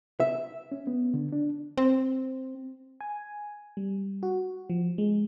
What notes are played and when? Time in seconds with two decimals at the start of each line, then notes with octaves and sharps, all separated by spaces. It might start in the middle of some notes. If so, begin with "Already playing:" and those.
0.20 E5
0.72 C#4
0.87 B3
1.14 D3
1.32 D4
1.78 C4
3.01 G#5
3.77 G3
4.23 F#4
4.70 F3
4.98 G#3